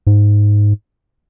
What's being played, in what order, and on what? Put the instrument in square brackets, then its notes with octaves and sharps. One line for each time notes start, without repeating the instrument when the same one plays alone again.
[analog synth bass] G#2